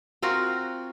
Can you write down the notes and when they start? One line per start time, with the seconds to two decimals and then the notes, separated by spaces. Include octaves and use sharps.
0.22 C4 F4 F#4 A#4